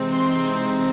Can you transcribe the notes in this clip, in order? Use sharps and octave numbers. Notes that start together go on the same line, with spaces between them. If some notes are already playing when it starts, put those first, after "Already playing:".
Already playing: C3 E3 G#3 C4 D#4
C6